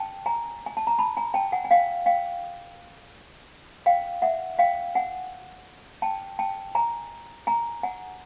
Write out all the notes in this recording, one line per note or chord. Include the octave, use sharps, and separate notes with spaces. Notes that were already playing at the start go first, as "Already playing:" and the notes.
Already playing: G5 A5
G#5 A#5
G#5
A5
A#5
A5 B5
G#5 A#5
G5 A5
F#5 G#5
G#5
F5 G5
F5 G5
F5 G5
E5 F#5
F5 G5
F#5 G#5
G5 A5
G5 A5
G#5 A#5
G#5 A#5
F#5 G#5